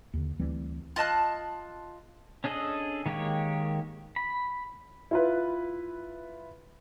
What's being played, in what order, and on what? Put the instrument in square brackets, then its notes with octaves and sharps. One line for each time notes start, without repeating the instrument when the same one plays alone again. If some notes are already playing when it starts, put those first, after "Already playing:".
[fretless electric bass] D#2 D3
D2 E3 G3 C4
[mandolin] F4 D#5 A5 F#6
[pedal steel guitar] C#4 D4 G#4 A4 D#5
D#3 G#3 A#3 G4 C#5
B5
[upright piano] E4 F4 B4